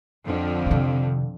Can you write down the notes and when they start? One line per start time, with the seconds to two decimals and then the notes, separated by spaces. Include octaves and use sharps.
0.24 F2 D3 F3
0.66 C3 D#3